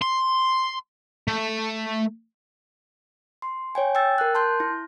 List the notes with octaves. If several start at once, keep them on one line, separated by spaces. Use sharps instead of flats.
C6
A3
C6
C#5 G5 G#5
G5 E6 A6
A#4 F#6
A5 C6 G6
E4